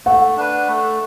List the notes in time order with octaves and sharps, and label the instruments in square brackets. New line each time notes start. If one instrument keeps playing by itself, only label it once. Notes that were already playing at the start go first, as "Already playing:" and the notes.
[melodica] A3 [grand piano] F#5
[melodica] D4 B4
A3